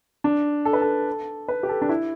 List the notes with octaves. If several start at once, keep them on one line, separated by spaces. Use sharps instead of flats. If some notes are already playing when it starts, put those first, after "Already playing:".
D4
A4
B4
A4
B4
G4
A4
D4
E4